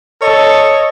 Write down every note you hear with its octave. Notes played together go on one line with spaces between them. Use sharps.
A4 C#5 D#5